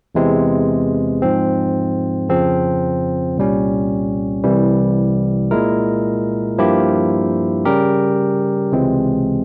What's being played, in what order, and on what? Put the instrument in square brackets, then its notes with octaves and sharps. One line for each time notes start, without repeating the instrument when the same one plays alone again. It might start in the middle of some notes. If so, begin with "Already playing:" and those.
[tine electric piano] E2 C3 E3 G#3 C4
G#2 F3 C4
F2 C#3 F3 C4
C2 A#2 G3 C#4
C2 C3 E3 G3
A#2 G#3 E4 A#4
G2 F3 A#3 E4 G4
C#3 G3 C#4 G4 A#4
C#2 C3 E3 G#3 C4